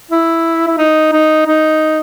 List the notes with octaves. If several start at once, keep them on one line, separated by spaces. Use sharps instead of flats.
E4
E4
D#4
D#4
D#4